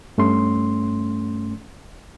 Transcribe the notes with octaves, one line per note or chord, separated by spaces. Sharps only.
G2 A3 C#4 C6